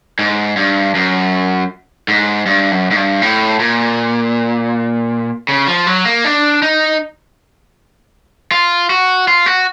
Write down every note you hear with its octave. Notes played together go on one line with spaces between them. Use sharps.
G#2
G2
F#2
G#2
G2
F#2
G#2
G2
A2
A#2
C#3
F3
F#3
A#3
D4
D#4
F4
F#4
F4
F#4